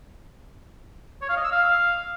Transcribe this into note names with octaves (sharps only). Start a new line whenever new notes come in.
C#5
F5
D#5
E6
F5